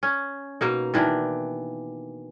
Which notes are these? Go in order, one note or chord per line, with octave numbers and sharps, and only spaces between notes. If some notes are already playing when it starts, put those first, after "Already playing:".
C#4
B2 A#3 D#4
D#3 E3 D4